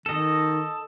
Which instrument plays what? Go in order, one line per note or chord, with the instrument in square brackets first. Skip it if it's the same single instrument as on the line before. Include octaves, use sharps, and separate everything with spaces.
[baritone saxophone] D#3 [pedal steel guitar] A4 D#5